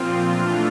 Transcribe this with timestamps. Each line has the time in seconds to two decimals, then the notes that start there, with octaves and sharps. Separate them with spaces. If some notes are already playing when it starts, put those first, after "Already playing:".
Already playing: A#2 F3 C4 F4
0.26 E3 A3 D4 F4